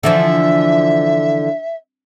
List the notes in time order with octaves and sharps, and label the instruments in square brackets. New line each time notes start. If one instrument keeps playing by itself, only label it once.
[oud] D3 E3 F3 [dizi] E5